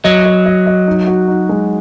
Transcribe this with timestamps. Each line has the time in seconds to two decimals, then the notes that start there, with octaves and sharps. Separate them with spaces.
0.04 F#3 D#5
0.26 D#5
0.46 D#5
0.67 D#5
0.87 D#4
1.07 F#4
1.28 D#4
1.49 G#3